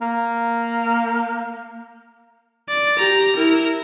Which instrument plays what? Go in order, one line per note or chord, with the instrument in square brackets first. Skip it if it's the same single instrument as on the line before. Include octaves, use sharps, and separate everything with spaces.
[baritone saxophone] A#3
[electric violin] D5
G4 A#5
E4 A#4